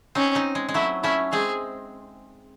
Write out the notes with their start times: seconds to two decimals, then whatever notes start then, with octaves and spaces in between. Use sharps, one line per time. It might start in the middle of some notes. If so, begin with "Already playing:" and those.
0.15 C4 C#4 D#4
0.35 C4 D#4
0.55 G#3
0.69 G#3
0.74 F#3 A3 E4
1.03 A3 C#4 E4
1.33 G#3 C4 G#4